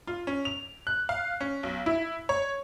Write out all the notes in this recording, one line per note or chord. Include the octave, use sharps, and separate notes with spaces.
F4
C#4
F7
F#6
F5
C#4
B1
E4
C#5